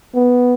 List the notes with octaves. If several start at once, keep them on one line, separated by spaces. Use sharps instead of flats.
B3